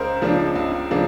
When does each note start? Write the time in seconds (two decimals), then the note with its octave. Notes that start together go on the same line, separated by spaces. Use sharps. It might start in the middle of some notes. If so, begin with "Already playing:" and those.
Already playing: C#2 A#4 C5
0.21 C#3 F3 A#3 D4
0.55 C#2
0.91 C#3 F3 A#3 D4